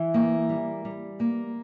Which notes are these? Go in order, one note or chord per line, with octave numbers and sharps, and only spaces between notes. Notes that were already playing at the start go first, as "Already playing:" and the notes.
Already playing: E3
A#3
G3
G3
A#3